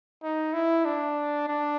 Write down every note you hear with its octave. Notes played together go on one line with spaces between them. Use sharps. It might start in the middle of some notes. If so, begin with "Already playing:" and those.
D#4
E4
D4
D4